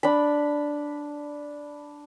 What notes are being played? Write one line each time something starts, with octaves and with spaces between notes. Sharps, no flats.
D4 B5